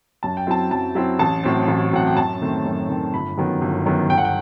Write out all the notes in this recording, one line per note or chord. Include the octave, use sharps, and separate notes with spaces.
F#2 A5
G5
F#3 C4 E4 A5
F#2 A5
F#3 C4 E4
A1 A5
A2 F#3 C4
A1
A2 F#3 C4 F#5
G5
F#2 A5
D#3 A3 C4
F#2
D#3 A3 C4
G1 B5
F#2 D#3 F#3 B3
G1
F#2 D#3 F#3 B3
G1 G5
F#5
G5